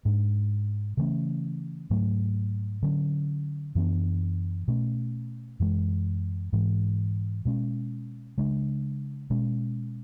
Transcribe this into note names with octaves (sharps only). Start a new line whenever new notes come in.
G#2 G#3 D4
C#3 E3 A3 C#4
G#2 F#3 A3
D3 F#3 C#4
F#2 E3 B3 D4
B2 A3 C#4
F#2 E3 G#3
G#2 E3 G#3
B2 G#3 C#4
C#3 G#3 D4
B2 G#3 C#4